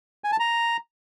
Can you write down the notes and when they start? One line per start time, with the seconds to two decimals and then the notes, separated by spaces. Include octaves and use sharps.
0.24 G#5
0.32 A5
0.40 A#5